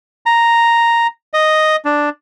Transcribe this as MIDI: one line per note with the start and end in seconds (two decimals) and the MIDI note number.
0.26 1.07 82
1.34 1.76 75
1.85 2.09 62